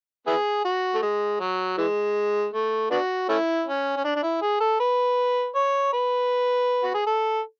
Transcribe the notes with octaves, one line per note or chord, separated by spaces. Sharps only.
B3 E4 G#4
F#4
A3
G#3
F#3
E3 G#3
A3
B3 D4 F#4
A3 C#4 E4
C#4
C#4
D4
D4
E4
G#4
A4
B4
C#5
B4
F#4
G#4
A4